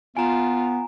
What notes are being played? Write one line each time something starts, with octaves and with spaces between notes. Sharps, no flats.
B3 F4 G#5 A#5